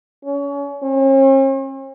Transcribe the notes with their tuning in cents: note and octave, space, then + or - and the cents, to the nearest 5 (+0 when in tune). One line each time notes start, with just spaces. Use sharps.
C#4 +30
C#4 -45